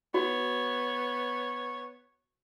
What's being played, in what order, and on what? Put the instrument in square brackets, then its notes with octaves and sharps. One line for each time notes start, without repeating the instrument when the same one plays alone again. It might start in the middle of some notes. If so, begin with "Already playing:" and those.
[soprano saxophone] B3 [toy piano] F#4 [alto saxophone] C#5